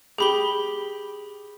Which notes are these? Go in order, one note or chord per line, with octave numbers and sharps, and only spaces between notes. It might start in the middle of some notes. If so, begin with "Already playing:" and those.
G4 G#4 B5 D6 G7